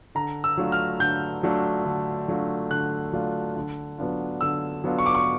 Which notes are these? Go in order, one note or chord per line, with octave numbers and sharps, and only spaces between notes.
D3 A#5
E6
F#3 A3 D4 F4
F6
D3 G6
F#3 A3 D4 F4
D3
F#3 A3 D4 F4
D3 F#6
F#3 A3 D4 F4
D3
F#3 B3 D4 F4
D3 E6
F#3 B3 D4 F4
C#6
D6
C#6